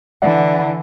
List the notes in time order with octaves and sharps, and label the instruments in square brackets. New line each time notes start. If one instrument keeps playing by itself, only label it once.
[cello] D3 E3 [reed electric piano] D5 E5 F#5